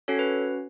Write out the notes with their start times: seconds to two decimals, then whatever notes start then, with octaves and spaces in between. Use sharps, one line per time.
0.08 C#4 F#4 A4 C#5
0.19 B4